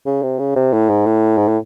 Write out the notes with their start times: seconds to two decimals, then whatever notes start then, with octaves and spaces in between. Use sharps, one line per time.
0.06 C#3
0.23 C3
0.39 C#3
0.56 C3
0.73 A2
0.90 G#2
1.06 A2
1.38 G#2
1.48 A2